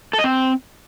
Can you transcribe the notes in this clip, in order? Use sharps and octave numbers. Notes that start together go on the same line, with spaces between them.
A4
D#5
C4